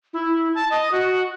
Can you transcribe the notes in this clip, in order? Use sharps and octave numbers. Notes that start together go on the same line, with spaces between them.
E4
A5
D#5
F#4